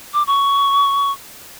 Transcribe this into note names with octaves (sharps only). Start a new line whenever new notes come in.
D6
C#6